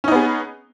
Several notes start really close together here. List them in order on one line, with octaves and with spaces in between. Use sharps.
C#4 D#4 B3 G#4